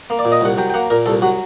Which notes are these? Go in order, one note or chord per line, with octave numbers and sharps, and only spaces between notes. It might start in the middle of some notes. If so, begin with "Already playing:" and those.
A#3
D5
A#2
D#5
C2 F#5
F#3 G5
G5
A#3 F#5
A#2 A#4
C2 A4
F#3 F#4